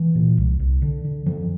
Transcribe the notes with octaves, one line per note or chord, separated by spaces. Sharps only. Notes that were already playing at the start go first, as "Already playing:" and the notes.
Already playing: E3
A#2
C2
C2
D3
D3
F#2 F3